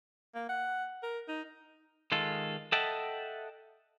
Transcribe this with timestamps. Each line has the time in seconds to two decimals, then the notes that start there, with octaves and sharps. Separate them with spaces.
0.35 A#3
0.49 F#5
1.03 A#4
1.28 D#4
2.12 D#3 G#3 F4 A4
2.72 A4 D#5 E5 F#5 G5 A5